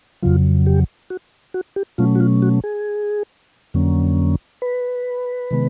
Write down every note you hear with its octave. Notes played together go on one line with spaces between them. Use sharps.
F2 C#3 F#3 F4
G4
F#4
F#4
G4
B2 F#3 A3 C#4 F4
F#4
F4
F#4
G#4
F2 D3 F#3 A#3 C#4
B4
C3 D#3 G#3 B3